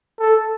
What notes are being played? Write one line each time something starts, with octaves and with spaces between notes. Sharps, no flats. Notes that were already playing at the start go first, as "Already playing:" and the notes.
A4